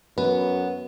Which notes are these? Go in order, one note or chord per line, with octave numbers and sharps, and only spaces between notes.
F#2 B3 B4